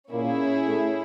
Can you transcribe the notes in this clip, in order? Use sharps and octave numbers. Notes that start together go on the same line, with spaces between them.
A#2 A#3 C#4 E4 G#4
A2 A3